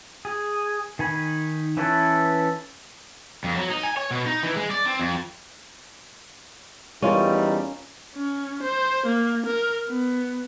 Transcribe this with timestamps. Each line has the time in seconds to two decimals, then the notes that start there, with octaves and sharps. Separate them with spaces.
0.25 G#4
0.99 D#3 G#5 B5
1.77 E3 C#4 E4 A4 B4
3.44 F2
3.55 F#3
3.70 D#4
3.84 G#5
3.97 C#5
4.11 B2
4.26 D#4
4.43 E3
4.56 G#3
4.71 D5
4.85 C4
4.99 F2
7.02 E2 G3 C#4 D#4 F4 A#4
8.16 C#4
8.63 C5
9.07 A#3
9.47 A#4
9.89 B3